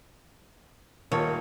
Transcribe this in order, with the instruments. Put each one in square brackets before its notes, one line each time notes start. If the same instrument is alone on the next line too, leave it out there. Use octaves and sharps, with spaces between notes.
[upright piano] D#1 [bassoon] D#3 [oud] C#5